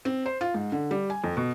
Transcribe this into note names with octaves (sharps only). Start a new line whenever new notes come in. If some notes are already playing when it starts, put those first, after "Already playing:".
C4
C5
F4
G#2
D3
G3
G#5
F2
B2